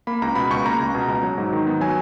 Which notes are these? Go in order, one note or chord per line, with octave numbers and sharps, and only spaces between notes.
A#3 B5
C#2 A#5
B2 B5
C#2 C#6
A#3 A#5
C#2
B2
C#2
F#3
G#2
D#3
B3
F#3 G#5